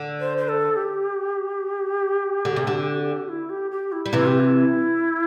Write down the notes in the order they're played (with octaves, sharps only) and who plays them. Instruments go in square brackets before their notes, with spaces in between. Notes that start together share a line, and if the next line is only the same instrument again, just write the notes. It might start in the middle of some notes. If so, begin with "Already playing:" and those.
Already playing: [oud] D3
[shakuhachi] C5
C5
A4
G4
[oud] D3
C3
D3
[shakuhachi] E4
G4
G4
E4
[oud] G3
[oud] C3 E3 [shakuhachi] E4
[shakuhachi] G4
E4